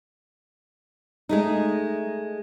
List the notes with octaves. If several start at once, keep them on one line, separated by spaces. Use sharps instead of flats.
G#3 A3 D#4